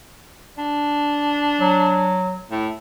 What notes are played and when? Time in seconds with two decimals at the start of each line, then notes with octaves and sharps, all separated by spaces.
0.58 D4
1.60 F#3
2.51 A2